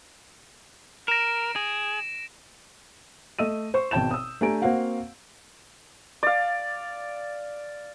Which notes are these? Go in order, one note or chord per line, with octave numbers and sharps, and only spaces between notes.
A#4 A#6 D7 E7
G#4
A3 D#5 E6 D#7
C5 C#6
G#1 B2 G5 A5 G6 E7
D#6 E6
A3 D4 G4 G#5 A#5 D7
A#3 C4 F#4 F5 F#5
D5 F5